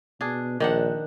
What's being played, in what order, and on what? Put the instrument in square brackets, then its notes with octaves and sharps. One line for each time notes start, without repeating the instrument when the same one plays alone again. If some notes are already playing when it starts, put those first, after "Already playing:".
[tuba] B2 [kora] D4 G#4
[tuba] A#1 [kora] D#3 D4 F#5